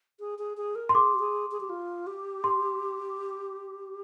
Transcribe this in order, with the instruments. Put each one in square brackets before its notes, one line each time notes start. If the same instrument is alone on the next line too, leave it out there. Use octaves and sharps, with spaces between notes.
[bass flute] G#4
G#4
G#4
A#4
[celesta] C6
[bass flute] G#4 [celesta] D6
[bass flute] G4
G#4
G#4
G4
F4
G4
[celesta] C6